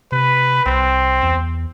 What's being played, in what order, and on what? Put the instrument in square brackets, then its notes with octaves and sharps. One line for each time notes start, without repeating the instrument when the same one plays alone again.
[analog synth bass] C3 [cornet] B4
[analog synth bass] C2 [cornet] C4
[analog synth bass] E2